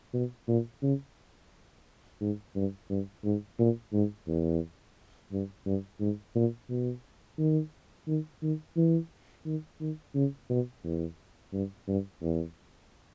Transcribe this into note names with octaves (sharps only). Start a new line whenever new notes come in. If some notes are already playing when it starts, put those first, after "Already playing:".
B2
A#2
C#3
G#2
G2
G2
G#2
A#2
G#2
E2
G2
G2
G#2
A#2
B2
D#3
D#3
D#3
E3
D#3
D#3
C#3
B2
E2
G2
G2
E2